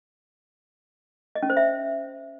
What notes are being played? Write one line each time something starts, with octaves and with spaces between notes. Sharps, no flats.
D#5
C#4
C5
E5